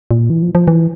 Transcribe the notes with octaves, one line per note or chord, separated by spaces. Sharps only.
A#2
E3
F3
F3
E3